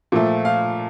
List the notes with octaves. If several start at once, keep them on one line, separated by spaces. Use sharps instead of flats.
A#2 F3 A3
F5